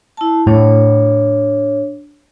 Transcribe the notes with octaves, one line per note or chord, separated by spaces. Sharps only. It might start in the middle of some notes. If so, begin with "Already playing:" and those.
E4 A5
A2 D4 C#5